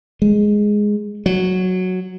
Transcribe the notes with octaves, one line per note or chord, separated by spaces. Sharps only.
G#3
F#3